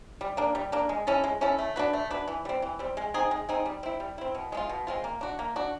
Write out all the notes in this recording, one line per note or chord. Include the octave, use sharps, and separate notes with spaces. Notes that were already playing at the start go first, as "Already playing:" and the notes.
G3
A#3 D4
G3
A#3 D4
G#3
C#4 E4 A4
G#3
C#4 E4 A4
A3
D4 F#4 B4
A3
D4 F#4 B4
E3
G3 C4
E3
G3 C4
G#3
C4 D#4 G#4
G#3
C4 D#4 G#4
G3
C4 E4
G3
C4 E4
B2
G#3 C4 F4
B2
G#3 C4 F4
A#3
D4 F#4
A#3
D4 F#4